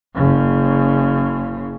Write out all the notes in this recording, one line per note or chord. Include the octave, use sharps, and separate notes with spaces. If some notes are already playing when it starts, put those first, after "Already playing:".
F#1 C#3